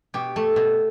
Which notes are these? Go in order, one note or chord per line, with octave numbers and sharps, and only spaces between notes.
B2 G4
A3
B2